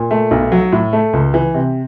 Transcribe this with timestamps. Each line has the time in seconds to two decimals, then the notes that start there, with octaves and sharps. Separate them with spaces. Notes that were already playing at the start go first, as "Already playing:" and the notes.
Already playing: A#2
0.11 A3
0.31 B1
0.52 F#3
0.72 A2
0.93 A3
1.13 C#2
1.34 E3
1.54 C3